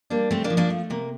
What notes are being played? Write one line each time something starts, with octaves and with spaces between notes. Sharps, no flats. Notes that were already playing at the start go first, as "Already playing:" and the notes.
G3 A#3 D4
C3 A3 C4
A#3 D4
F3
A#3 D4
A3
C3 A#3